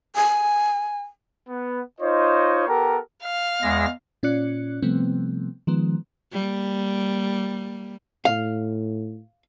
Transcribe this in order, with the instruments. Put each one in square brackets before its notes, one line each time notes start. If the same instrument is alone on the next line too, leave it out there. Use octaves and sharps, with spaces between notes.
[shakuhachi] G#5
[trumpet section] B3
D#4 F4 C5 C#5 D#5
B3 G4 A4 A#4
[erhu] F5
[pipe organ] E2 G#3 A#6
[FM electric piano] A#2 C#4 F4 D5 F#6 C#7
C3 F3 G3 A3 B3 C4
D#3 F3 G#3 B3
[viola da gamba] G3 A#3
[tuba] A2 [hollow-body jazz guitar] F5